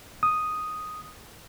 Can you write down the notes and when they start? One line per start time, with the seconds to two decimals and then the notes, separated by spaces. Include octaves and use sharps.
0.23 D#6